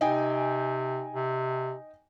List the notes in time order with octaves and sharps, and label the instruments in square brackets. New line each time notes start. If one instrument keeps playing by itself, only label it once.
[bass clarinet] C3 [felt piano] D#4 G5 G#5
[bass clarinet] C3